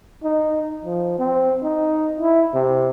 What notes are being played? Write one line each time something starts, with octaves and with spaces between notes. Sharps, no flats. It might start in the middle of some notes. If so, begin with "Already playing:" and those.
D#4
F3
C4
D#4
E4
C3